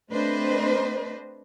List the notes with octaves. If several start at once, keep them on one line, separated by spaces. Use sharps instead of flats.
A3 C4 D4 B4 C5 D#5